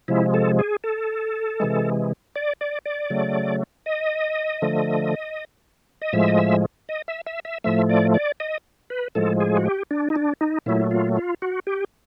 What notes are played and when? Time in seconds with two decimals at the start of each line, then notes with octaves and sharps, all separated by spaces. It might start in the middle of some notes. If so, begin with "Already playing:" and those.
0.08 C3 F3 G#3 E4
0.34 A4
0.59 G#4
0.84 A4
1.60 C3 E3 G#3
2.36 D5
2.61 D5
2.85 D5
3.10 C#3 F#3 A3
3.86 D#5
4.62 D3 F3 A3
6.02 D#5
6.13 A2 F3 G#3 E5
6.28 D#5
6.39 E5
6.89 D#5
7.08 E5
7.27 E5
7.45 E5
7.64 A2 F3 A3 E5
7.89 D5
8.14 D5
8.40 D#5
8.90 B4
9.15 A2 F3 G#3 A4
9.40 G#4
9.57 F#4
9.65 G4
9.91 D4
10.10 D#4
10.16 D4
10.41 D#4
10.66 A#2 F#3 A3 E4
10.91 F4
11.17 F4
11.42 F#4
11.67 G4